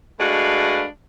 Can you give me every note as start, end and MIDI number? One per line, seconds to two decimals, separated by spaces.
0.20 0.85 56
0.20 0.85 57
0.20 0.85 62
0.20 0.85 66
0.20 0.85 71
0.20 0.85 77